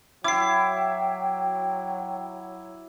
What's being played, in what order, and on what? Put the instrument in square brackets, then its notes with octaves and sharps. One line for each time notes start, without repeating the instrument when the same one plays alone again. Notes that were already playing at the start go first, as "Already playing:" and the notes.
[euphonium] F#3 [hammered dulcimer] E4 [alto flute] G5 [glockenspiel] D6 C7